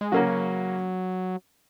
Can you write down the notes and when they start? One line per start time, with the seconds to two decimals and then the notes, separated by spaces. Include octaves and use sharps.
0.01 G#3
0.12 C#3 F#3 A#3 C#4 F#4